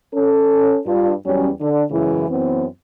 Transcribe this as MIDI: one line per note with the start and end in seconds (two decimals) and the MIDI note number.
0.14 0.79 61
0.14 0.79 69
0.87 1.12 43
0.87 1.12 62
0.87 1.12 65
1.26 1.49 40
1.26 1.49 54
1.26 1.49 55
1.26 1.49 61
1.61 1.84 50
1.61 1.84 62
1.91 2.29 42
1.91 2.29 49
1.91 2.29 52
1.91 2.29 56
1.91 2.29 64
2.30 2.66 42
2.30 2.66 52
2.30 2.66 59
2.30 2.66 60